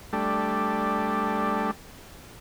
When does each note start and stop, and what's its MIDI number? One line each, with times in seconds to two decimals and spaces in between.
0.13 1.71 55
0.13 1.71 57
0.13 1.71 62